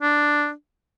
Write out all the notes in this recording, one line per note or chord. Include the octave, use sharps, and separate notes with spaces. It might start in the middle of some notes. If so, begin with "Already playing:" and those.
D4